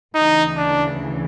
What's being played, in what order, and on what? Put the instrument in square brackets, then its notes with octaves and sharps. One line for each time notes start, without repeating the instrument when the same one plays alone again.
[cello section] D2 C#3 E3 [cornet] D#4
[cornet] D4